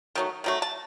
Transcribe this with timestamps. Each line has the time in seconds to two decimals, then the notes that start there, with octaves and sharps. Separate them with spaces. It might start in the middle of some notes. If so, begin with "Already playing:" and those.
0.15 D#3 F#3 A3
0.44 D#3 F#3 A3
0.62 A5